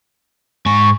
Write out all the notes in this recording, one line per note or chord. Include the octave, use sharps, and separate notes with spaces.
G#2 G#5 C#6